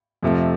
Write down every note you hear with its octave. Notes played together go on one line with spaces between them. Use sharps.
F2 C3 F3 A3